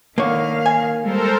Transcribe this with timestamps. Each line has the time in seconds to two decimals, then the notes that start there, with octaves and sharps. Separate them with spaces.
0.18 D3 D#3 A#3 C#5 F5
0.66 G#5
1.02 G3 G#3 A4 A#4 C5